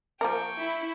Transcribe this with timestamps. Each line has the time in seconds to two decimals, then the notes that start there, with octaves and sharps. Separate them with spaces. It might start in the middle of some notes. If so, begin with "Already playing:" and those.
0.21 F3 A#3 A#4 G5 C#6
0.58 E4